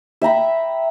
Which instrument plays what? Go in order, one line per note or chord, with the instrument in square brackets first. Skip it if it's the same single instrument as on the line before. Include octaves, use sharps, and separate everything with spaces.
[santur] E5 G5 A#5 B5